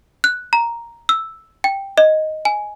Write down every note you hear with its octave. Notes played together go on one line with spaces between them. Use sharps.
F#6
A#5
E6
G5
D#5
G#5